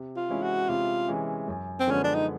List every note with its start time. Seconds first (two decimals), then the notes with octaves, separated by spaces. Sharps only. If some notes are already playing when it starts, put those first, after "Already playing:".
Already playing: C3
0.16 F4
0.29 E3 G#3 C#4 E4
0.43 F#4
0.69 C3 F4
1.08 E3 G#3 C#4 E4
1.48 F#2
1.80 C4
1.87 D3 F3 G#3 B3 C#4
2.04 D4
2.15 D#4